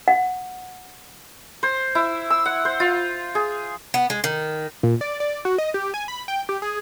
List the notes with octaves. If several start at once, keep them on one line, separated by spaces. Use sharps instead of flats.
F#5
C5
E4
E6
F#5
C5
F4
G#4
B3
G#3
D#3
A#2
D5
D5
F#4
D#5
G4
G#5
B5
G5
G4
G#4